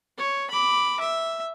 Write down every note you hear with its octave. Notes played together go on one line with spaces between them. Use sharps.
C#5
B5 D6
E5